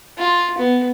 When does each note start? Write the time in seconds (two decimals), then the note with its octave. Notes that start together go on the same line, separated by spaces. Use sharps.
0.18 F4
0.58 B3